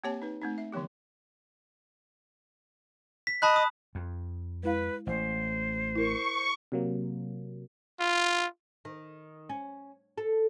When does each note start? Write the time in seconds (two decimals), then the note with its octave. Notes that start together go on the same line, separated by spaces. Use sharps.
0.04 A#3 C4 G4 C#5 G#5 A5
0.22 D#4 B4
0.42 A3 C4 D#4
0.58 E5
0.72 D3 E3 F3 B3 G4
3.27 B6
3.42 D#5 A5 B5 F#6
3.56 D#6
3.95 F2
4.63 G#3 E4 B4 F5
5.07 A1 C5
5.95 E4 A#4 C#6
6.72 C3 F#3 A#3
8.00 F4
8.85 D#3
9.49 C#4
10.18 A4